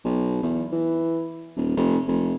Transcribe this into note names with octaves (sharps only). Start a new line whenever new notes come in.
B1
E2
E3
D#1
F1
F1